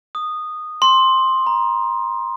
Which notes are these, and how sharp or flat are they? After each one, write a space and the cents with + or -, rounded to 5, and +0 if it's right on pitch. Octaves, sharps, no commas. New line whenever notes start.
D#6 -10
C6 +10
A#5 +25